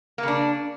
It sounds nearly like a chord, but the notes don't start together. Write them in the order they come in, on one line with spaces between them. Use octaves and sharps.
A#3 C#3 D4